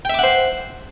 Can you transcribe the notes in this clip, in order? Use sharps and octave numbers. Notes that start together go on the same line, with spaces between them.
C5 E5 F#5 G5 D6